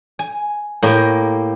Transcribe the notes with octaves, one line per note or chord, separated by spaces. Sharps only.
G#5
A2 A#3 G4